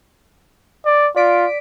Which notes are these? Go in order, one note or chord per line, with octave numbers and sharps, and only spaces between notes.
D5
F4 D5 B6 D7